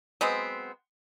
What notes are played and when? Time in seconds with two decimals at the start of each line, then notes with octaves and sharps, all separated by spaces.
0.21 F#3 G#3 B3 C4